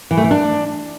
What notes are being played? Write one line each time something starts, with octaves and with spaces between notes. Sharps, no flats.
E3
A3
E3
D4